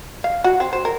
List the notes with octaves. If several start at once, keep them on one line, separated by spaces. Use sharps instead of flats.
F5
F#4
C4
C5
A#4